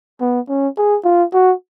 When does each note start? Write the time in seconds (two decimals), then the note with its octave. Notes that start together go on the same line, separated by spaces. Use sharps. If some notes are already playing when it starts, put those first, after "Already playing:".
0.21 B3
0.49 C#4
0.78 G#4
1.05 F4
1.33 F#4